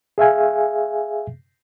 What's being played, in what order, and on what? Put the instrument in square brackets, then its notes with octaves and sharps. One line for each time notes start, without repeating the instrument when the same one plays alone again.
[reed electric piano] G#4 E5 F5 G#5